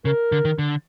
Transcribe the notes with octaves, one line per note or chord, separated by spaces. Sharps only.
C#3 A#4
D3
D#3
D3